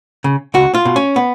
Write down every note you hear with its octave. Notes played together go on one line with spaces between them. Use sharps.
C#3
C#2 F#4
F4
B2
C#4
B3